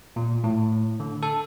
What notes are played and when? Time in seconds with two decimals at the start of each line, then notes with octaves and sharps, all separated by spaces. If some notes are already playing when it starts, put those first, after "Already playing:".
0.16 A#2
0.44 A2
1.00 D3
1.23 A4